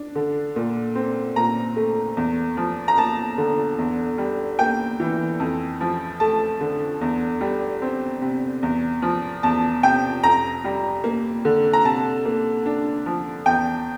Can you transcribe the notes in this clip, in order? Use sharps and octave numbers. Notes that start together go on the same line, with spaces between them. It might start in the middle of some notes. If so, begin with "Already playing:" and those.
Already playing: D4
D3
A#2
C4
A#2 A#5
A3
E2
F3
A#5
A#3 A5
D3
E2
G3
A#3 G5
E3
F2
F3
A3 A5
D3
E2
G3
C4
C3
E2
F3
E2 A5
C3 G5
F2 A#5
G3
A#3
D3
A#5
C3 A5
A#3
D4
F3
E2 G5